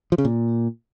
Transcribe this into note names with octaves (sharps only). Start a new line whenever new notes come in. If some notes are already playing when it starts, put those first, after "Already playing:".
F3
C#3
A#2